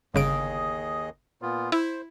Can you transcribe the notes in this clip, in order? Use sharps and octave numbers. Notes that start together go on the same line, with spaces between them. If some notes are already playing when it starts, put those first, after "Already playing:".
G1 D#2 C#3 G#4 D#5 D7
A#2 B3 F4
E4 C5